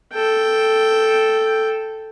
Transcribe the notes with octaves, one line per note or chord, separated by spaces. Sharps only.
A4 G5